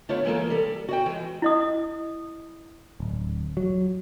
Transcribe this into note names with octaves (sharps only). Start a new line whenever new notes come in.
D3 A3 B3 F4 C#5
E3 G#3 A#3 A4 A#4
G3 A4
F#4 D5 G5
E3 G#3
E4 D#5 D#6
D1
F#3